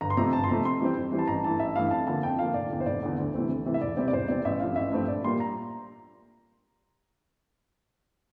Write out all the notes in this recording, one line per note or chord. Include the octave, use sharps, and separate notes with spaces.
G1 A#5
C6
F2 C3 F3 A3 A#5
G1 A5
C6
F2 C3 F3 A3 A#5
F2 C6
E3 G3 C4
F2
E3 G3 C4
A5
A1 A#5
G2 E3 A3 A5
A1 E5
G2 E3 A3 F5
F2 A5
D3 F3 A#3 A5
F2 G5
D3 F3 A#3 F5
F1 D5
E2 D3
C5
F1 D5
E2 D3
D2
C3 E3 A3 C4
D2
C3 E3 A3 C4
E5
E1 D5
E2 C3 G3 C4 D5
D5
E1 C5
E2 C3 G3 C4 D5
A1 E5
G2 F3 A3 C4 F5
A1 E5
G2 F3 A3 C4
A#1 D5
A#2 G3 A#3 C6
A#5